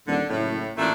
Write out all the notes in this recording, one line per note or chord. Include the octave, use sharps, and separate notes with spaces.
D#1 D3
F#1 A2
A1 A#2 A3 D4